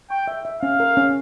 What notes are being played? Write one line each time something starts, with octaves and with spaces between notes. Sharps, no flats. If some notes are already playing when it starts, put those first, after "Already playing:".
G5 C#6
E5
E5
C#4 F5
A#4
C#4